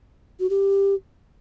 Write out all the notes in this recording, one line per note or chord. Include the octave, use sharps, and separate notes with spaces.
F#4
G4